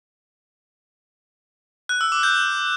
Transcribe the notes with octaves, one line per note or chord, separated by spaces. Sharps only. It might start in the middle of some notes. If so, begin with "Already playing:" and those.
F#6
E6
D6
G6